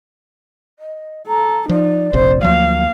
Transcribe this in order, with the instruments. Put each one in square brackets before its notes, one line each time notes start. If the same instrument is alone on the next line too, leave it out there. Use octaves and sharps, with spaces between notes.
[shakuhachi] D#5
[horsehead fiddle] A4 [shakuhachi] A#5
[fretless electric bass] F3 [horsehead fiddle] D#4 [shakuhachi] D5
[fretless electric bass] F1 A#1 C3 [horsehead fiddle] C5
[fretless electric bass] D2 F3 F#3 [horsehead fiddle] A#3 F5